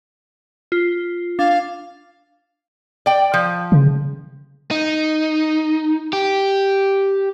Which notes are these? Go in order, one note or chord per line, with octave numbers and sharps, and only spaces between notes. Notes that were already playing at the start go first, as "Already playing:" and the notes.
F4
D4 F5
D5 G5
F3
C#3
D#4
G4